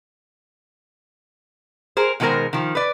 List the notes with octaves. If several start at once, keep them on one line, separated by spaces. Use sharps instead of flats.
G#4 A#4 C5
B2 D#3 G#3 G#4 A#4 C5
D#3 F3
B4 D5